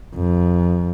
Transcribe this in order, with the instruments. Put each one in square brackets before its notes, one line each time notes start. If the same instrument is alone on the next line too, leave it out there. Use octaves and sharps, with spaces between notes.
[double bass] F2